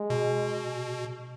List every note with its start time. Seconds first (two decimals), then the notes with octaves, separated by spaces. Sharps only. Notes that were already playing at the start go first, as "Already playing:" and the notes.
Already playing: G#3
0.10 B2